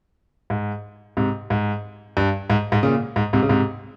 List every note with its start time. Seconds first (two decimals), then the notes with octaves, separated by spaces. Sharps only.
0.50 G#2
1.17 G#2 C3
1.50 G#2
2.17 G2
2.50 G#2
2.72 G#2
2.83 A#2 C#3
3.16 G#2
3.33 G#2 C3
3.43 C#3
3.49 G#2 C3